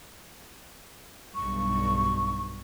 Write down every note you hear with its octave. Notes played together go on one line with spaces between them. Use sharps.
B1 G2 C#6